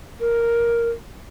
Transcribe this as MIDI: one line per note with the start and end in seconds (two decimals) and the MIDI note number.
0.21 0.89 70